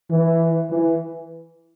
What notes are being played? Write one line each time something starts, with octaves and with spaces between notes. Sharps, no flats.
E3
E3